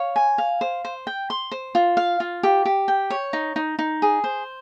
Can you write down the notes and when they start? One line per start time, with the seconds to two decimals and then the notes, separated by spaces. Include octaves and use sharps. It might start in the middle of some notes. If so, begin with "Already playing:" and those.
Already playing: C#5 F5
0.16 G#5
0.38 F5
0.61 C5
0.85 C5
1.07 G5
1.30 C6
1.52 C5
1.75 F4
1.97 F5
2.20 F4
2.43 G4
2.65 G4
2.88 G5
3.10 C#5
3.33 D#4
3.56 D#4
3.79 D#4
4.02 G#4
4.24 C5